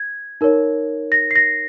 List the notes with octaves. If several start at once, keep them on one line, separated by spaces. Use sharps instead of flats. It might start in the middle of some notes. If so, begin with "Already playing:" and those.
Already playing: G#6
D#4 A#4 C#5
A#6
C7
A#6